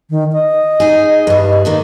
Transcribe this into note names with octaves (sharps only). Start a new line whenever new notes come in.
D#3
D#5
D#4 G#4
G2 G3
D#3 A#3 D4